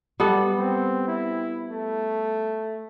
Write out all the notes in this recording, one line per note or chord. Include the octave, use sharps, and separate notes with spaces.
G3 B3 A4
C4
E4
A3